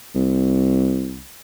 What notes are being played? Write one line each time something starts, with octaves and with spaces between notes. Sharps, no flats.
C2